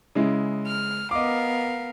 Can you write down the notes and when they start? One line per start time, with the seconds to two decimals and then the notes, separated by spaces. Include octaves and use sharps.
0.15 C#3 G#3 E4
0.66 F6
1.11 B3 A#4 D#5 F5 D6